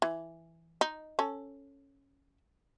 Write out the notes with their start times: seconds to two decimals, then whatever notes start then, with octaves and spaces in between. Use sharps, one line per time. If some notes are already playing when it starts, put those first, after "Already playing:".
0.02 E3
0.81 D#4
1.19 C#4 A4